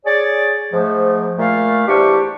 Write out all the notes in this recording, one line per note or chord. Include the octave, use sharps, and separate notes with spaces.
G#4 C#5 D5
G#2 F3 A3
A#2 A3 F5
E2 G3 D4 G4 C5 C#6